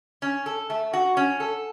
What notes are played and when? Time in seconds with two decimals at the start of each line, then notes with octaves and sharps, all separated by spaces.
0.22 C#4
0.46 A4
0.70 A3
0.93 F#4
1.17 C#4
1.40 A4